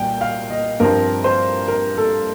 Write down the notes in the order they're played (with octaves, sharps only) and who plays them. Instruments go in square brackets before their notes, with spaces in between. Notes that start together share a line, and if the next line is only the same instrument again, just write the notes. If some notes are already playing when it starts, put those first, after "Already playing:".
Already playing: [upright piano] C2 A#2 G5
F5
D#5
G2 F3 C4 A#4
C5
A#4
A4